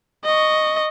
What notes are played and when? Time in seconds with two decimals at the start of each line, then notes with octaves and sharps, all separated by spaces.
0.25 D#5 C#6